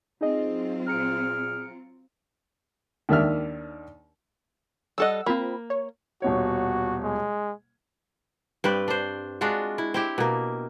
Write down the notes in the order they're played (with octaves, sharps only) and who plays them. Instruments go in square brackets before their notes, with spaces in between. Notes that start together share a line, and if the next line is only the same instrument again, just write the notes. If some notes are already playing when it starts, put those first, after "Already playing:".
[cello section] F#3 C4 F4 [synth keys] D#4 G#4 D#5
[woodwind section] A#2 G#4 F6 [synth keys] A#5 C#7 D7
[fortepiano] D#2 D#3 D4 E5 F6
[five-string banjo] G3 A4 D#5 [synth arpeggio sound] F#5 E6
[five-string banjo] A#3 [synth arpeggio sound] C4 F4 B5
[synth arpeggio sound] C#5
[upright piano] D#1 B2 C#5 [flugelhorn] F#4
[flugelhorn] G#3
[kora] G2 C4 B4 D5
D4 C5
G#3 D4 F4 F#4
E4
C4 E4 G4
B2 A#3